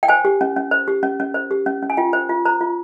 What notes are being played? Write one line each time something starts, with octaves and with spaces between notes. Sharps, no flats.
G5
C5 G#5
G4
C#4
C#4
C5
G4
C#4
C#4
C5
G4
C#4
C#4
G#5
F4 G5
C5
F4
C5 A#5
F4